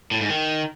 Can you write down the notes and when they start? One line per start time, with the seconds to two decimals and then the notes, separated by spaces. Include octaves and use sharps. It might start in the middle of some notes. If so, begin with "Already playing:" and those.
0.11 A2
0.21 G#2
0.30 D#3